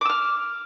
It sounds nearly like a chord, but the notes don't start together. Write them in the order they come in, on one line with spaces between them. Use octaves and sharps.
D6 E6 F6